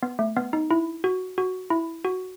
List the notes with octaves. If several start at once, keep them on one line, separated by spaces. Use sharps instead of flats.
B3
A3
B3
D#4
E4
F#4
F#4
E4
F#4